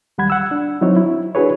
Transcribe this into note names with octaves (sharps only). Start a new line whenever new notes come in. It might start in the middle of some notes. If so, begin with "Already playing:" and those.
D#2 G3 F#5 B5 G#6
F#5 E6
D4
F#3 C4 D#4 E4 C#5
E4
D4 E4 F#4 G#4 B4 C#5